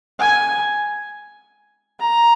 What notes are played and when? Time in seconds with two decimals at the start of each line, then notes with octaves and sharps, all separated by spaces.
0.20 G#5
2.00 A#5